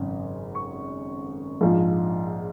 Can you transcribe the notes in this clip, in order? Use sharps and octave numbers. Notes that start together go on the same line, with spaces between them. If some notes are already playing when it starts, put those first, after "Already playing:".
Already playing: G#1 F#2 C#3
C#6
A#1 G#2 F3 G#3 F5